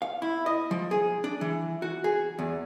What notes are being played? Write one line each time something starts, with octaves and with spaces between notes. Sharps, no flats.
F5
E4
D#5
F3
G#4
D4
E3
F#4
G#4
E2